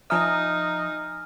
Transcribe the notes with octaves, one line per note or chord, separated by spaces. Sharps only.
F3 D#4 E5 G#5 A#5 D#6 F6